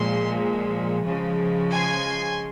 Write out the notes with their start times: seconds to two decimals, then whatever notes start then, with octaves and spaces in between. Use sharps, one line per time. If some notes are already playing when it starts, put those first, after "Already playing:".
Already playing: A#2 F3 G#3 C6
1.02 C#3 F3 G#3
1.72 G#5 C6